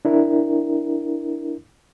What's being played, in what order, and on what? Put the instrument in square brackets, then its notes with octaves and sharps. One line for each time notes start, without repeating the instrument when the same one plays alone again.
[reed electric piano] D4 E4 A#4